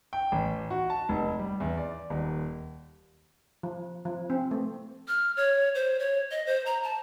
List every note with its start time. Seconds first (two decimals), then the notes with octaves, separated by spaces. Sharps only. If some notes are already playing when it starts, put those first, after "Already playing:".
0.13 G5
0.32 A1
0.70 F#4
0.90 A5
1.09 F1
1.39 G3
1.60 E2
1.78 D5
2.10 D#1
3.63 F3
4.05 F3
4.30 C4
4.51 A3
5.08 F6
5.37 C#5
5.75 C5
5.99 C#5
6.31 D#5
6.47 C5
6.66 A#5
6.83 A5